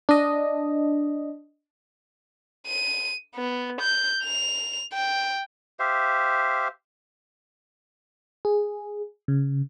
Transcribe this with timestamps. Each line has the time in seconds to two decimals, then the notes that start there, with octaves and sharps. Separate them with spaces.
0.09 D4 D#5
2.67 D#7
3.35 B3
3.81 G6
4.24 F7
4.93 G5
5.79 G4 C5 E5 F5
8.45 G#4
9.28 C#3